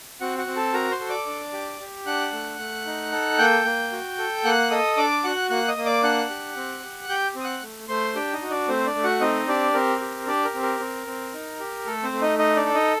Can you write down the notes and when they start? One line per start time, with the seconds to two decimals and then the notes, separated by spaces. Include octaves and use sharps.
0.21 C4 F#4 F#5
0.38 F#4 F#5
0.47 C4
0.56 A4 A5
0.73 F#4 A#4 A#5
0.91 C5 C6
1.00 A4
1.09 D5 D6
1.26 D4
1.53 G4
1.80 G4
2.06 D4 F#5 F#6
2.33 A3
2.59 A3
2.86 D#4
3.12 A4
3.39 A#3 G5 G6
3.65 A#3
3.92 F#4
4.18 A4
4.44 A#3 F#5 F#6
4.71 A4 D#5 D#6
4.97 D4 D5 D6
5.24 F#4 F#5 F#6
5.50 A#3 F#5 F#6
5.68 D#5 D#6
5.77 A#3
5.85 D5 D6
6.03 D4 F#5 F#6
6.30 G4
6.56 C4
6.83 G4
7.09 G4 G5 G6
7.35 C4 D#6
7.44 F#5 F#6
7.62 A3
7.88 A3 C5 C6
8.15 D4 G4 G5
8.33 D#4 D#5
8.42 F#4
8.51 D4 D5
8.68 A3 C4 C5
8.86 D4 D5
8.95 A3
9.04 F#4 F#5
9.21 C4 D#4 D#5
9.47 D4 G4 D5
9.74 C4 A#4
10.01 G4
10.27 D4 G4 D5
10.45 A#4
10.54 C4
10.62 A#4
10.80 C4
11.07 C4
11.33 D#4
11.60 G4
11.86 A3 A4
12.03 C4 C5
12.13 A3
12.21 D#4 D#5
12.39 D#4 D#5
12.57 D4 D5
12.65 A4
12.74 D#4 D#5